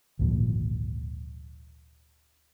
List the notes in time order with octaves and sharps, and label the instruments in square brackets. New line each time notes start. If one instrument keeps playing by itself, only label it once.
[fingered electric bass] G#1 D2 A#2 F3